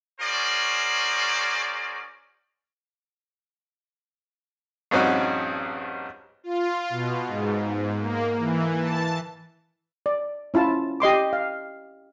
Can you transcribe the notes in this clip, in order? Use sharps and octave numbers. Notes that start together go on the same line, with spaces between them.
C#4 F#4 G#4 A#4 C5 D5
A#1 G2 C4 C#4 D#4 F#4
F4
B2
G#2
A#3
E3
A5
D5
C#4 E4 F4 A5
G4 D#5 C6 D6
F5